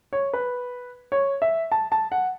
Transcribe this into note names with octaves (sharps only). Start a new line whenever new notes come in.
C#5
B4
C#5
E5
A5
A5
F#5